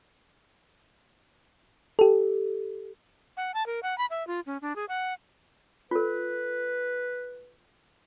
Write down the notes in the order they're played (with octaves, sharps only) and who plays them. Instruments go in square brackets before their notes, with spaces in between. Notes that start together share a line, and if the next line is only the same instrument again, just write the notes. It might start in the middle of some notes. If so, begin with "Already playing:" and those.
[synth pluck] G4 A4
[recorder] F#5
A5
A#4
F#5
B5
E5
F4
C#4
D4
G#4
F#5
[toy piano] F4 A4 [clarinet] B4